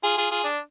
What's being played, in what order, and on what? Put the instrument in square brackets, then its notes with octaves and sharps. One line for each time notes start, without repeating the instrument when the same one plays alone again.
[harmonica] F4 G#4
F4 G#4
F4 G#4
D4